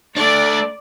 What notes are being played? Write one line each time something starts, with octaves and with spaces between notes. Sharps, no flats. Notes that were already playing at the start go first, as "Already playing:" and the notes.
A3 D4 D5